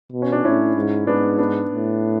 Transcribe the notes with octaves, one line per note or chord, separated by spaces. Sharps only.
B2
C#4
D4
A2 C#4 E4
G#2
G#2 B3 D4
B3 D4
A2